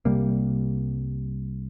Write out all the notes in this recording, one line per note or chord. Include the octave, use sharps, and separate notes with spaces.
C2 C3 G3 A#3